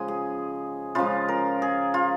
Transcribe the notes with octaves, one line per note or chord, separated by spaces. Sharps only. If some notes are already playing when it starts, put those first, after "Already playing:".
Already playing: C#3 F3 G#3 D#5 G#5
G#4
C#3 F3 G#3 F4
A#4
G#4
F4